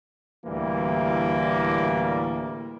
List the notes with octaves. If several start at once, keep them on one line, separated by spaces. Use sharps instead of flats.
D2 A2 E3 G3 A#3